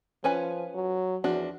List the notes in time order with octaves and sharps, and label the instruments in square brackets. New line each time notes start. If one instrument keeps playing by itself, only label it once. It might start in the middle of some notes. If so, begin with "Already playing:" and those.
[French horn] F3 [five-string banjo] C#4 B4 G#5
[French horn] F#3
[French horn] E2 [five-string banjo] F3 D4 F#4